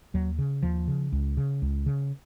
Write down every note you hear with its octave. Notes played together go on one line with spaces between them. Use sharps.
D#2 F#3
C#3
D#2 F3
C#3
C#2
C#3
C#2
C#3